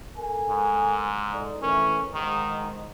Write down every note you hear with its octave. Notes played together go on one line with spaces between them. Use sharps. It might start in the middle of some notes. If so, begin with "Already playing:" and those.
A4 A#4 G#5
G#2
D#4 A4 D5
E3 A3 C#4 A#4
G#2 D#3